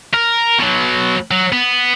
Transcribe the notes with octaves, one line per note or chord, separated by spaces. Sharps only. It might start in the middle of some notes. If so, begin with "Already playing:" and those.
A#4
B2 F#3
F#3
B3